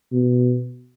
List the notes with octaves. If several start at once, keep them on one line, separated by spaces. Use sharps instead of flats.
B2